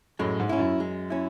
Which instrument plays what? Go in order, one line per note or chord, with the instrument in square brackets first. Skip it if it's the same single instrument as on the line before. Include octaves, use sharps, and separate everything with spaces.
[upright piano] F#2 A2 [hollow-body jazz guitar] G#3
[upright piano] G#2
[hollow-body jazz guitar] C#4 E4
[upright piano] F#2
[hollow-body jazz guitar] G#3
C#4 E4